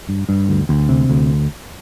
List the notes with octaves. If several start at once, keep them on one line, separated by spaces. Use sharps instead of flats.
G2
G2
D2
D2
C3
D2